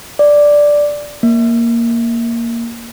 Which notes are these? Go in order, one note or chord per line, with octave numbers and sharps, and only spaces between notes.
D5
A#3